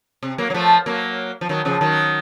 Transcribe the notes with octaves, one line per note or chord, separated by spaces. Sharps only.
C3
F#3 A#3
F#3
F3 A3
F#3 A#3
F3
D#3 F#3
C#3 F3
D#3 F#3